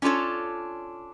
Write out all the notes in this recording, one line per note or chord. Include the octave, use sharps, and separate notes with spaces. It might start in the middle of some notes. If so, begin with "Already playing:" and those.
C#4 D4 F4 A4 C#5